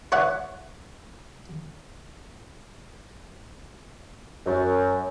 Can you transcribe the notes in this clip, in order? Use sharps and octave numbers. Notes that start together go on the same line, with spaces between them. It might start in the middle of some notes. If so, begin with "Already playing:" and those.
B4 C#5 E5 F#5
F#2